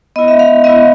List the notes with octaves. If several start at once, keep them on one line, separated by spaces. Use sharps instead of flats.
B3 E4 D#5
E5
F5
B3 E4 D#5